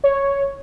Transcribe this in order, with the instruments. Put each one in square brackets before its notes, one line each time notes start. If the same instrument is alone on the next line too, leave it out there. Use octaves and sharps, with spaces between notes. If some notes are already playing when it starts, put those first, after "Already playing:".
[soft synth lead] C#5